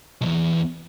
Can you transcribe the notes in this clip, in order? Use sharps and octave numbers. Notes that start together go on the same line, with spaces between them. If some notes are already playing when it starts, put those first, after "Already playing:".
B1 E2